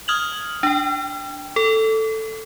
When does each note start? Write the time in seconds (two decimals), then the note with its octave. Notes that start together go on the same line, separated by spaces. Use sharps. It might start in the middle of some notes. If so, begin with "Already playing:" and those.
0.08 D#6 F6 G#6 F7 F#7
0.63 D4 G5
1.56 A4